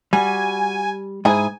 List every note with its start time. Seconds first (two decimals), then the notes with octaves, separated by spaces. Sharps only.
0.13 G3 F#4 G#5
1.25 G#2 E4 G#4 G#5